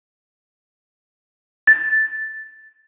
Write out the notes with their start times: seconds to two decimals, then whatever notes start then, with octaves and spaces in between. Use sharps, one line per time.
1.67 A6